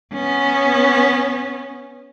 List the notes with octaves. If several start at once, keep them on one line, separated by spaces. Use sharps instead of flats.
B3 C#4